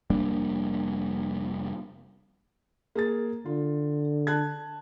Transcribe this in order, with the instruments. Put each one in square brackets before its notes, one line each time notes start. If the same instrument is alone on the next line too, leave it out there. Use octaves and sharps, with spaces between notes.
[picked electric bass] F1 G3 A#3 D4
[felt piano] A#3 G#4 A6
[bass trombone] D3 [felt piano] F4
[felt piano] A5 F#6 G#6